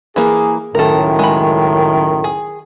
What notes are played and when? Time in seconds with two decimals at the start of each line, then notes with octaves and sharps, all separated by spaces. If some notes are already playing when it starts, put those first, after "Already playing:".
0.16 E3 A#3 G#4
0.75 C#2 F#2 A2 D#3 A4 A#4
1.19 G#3 B5
2.24 G#4